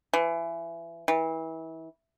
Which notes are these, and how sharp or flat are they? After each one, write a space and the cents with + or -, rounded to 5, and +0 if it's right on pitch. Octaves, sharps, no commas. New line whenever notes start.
E3 +25
E3 -30